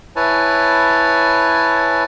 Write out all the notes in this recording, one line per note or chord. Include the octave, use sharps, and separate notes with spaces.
E4 B4 C#5 G#5 A5